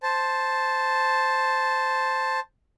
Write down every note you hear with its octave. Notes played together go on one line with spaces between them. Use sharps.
C5 A5